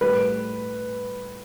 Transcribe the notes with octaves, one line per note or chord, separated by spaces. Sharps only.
A2 G3 B4